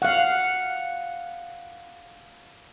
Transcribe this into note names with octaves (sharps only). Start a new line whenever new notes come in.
F5 F#5